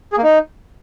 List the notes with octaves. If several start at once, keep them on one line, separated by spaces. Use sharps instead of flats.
G#4
A#3
D#4